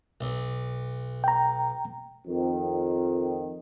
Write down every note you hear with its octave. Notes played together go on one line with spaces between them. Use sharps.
B1
G5 A#5
F2 D#3